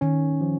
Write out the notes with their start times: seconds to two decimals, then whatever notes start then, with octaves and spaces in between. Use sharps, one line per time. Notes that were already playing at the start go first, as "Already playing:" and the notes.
0.01 D#3 C#4
0.41 F3